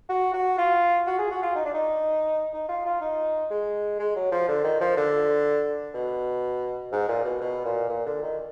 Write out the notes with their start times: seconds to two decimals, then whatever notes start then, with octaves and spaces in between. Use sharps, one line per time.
0.09 F#4
0.33 F#4
0.58 F4
1.06 F#4
1.19 G#4
1.31 F#4
1.42 F4
1.55 D#4
1.65 D4
1.74 D#4
2.53 D#4
2.68 F4
2.85 F4
3.01 D#4
3.50 G#3
3.99 G#3
4.16 F#3
4.32 F3
4.48 D3
4.64 D#3
4.81 F3
4.97 D3
5.94 B2
6.92 G#2
7.08 A#2
7.24 B2
7.41 B2
7.65 A#2
7.89 A#2
8.06 D3
8.22 D#3